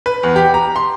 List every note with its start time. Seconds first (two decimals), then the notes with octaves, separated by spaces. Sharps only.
0.06 B4
0.23 E2
0.36 G4
0.54 A#5
0.76 C6